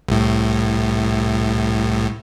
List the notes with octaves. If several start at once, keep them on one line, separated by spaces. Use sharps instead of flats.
C2 A2